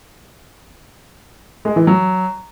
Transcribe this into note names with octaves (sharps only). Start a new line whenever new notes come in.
G#3
E3
F#3